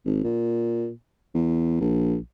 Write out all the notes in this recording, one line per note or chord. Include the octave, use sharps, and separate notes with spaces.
G#1
A#2
E2
A#1